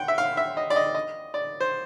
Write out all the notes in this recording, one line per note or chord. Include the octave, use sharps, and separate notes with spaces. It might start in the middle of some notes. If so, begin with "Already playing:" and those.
Already playing: F#5 G5
E5
F5
E5
D#5
D5
D#5
D#5
D5
C5